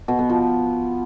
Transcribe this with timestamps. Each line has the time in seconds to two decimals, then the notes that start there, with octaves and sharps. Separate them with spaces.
0.08 B2
0.19 B3
0.29 F3